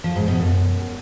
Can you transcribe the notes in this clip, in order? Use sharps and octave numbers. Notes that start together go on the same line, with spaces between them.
F3
G#2
B2
F#2